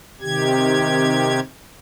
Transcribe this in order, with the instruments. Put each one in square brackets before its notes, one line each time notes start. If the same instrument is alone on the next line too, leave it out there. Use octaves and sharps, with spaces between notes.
[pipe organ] C3 D#3 G4 G#6